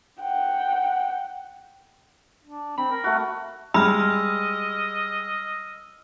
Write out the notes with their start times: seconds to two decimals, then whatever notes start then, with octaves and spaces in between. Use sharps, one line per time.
0.23 F#5 G5
2.45 D4
2.78 C4 B5
2.91 A#4
3.04 A3 F#4
3.74 G3 G#3 D#5 B5 E6 F6